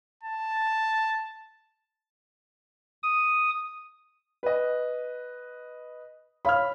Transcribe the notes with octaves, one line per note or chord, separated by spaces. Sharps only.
A5
D#6
B4 D#5
C#5 F5 B5 F6